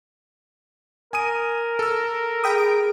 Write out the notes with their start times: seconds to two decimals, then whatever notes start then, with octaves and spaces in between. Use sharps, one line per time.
1.13 A#4 G#5 D#6 D#7
1.79 A4 E6
2.44 G#4 G5 B5 D#6
2.58 D7